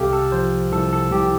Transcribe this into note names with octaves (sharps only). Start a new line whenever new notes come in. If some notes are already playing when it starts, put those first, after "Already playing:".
Already playing: C2 C3 G4 A4 F5
A4
F3 C5
C2 A4
A4
C2 G4